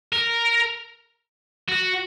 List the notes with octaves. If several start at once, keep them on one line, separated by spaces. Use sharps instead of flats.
A#4
F#4